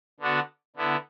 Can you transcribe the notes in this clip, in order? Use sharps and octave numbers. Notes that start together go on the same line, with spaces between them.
D3 B3 D4 F#4
D3 B3 E4